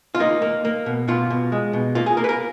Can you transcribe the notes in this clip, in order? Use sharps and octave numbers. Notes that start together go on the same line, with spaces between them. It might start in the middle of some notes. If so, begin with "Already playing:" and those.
F4
A#3 D#4
A#3
A#3
B2
B2 F4
B2
G#3
B2
A#3 F4
G#4
A#3 A#4
B4
A#4